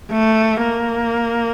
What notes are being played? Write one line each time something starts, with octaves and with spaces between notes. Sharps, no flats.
A3
A#3